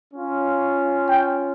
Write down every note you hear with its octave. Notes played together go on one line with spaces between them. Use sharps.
C#4 F4
G5